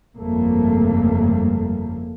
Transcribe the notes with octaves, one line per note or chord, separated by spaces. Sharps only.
G1 F2 C#3 G3 A3 A#3